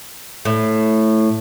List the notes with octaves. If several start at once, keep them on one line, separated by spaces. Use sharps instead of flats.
A2